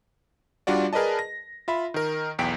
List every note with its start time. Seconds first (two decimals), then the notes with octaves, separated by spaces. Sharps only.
0.67 G3 D4 F4 F#4 D5
0.93 G#4 A#4 B4 D5 D#5 A5
1.19 A#6
1.68 F4 E5 B5
1.94 D#3 A#4
2.39 B1 E2 G5 B6 D7